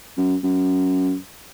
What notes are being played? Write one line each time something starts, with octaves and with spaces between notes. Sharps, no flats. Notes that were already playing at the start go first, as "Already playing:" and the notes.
F#2
F#2